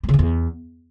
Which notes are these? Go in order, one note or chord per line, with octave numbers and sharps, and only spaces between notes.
G3
C#3
E3
E2